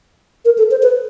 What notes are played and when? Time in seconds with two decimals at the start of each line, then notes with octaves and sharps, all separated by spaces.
0.45 A#4
0.58 A4
0.71 C5
0.83 B4